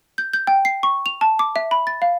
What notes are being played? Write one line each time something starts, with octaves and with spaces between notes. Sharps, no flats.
G6
G6
G5
C7
C#6
F7
A5
D6
E5
B5
A6
F5